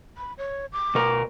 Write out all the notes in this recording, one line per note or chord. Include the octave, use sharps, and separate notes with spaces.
B5
C#5
D6
B2 A#4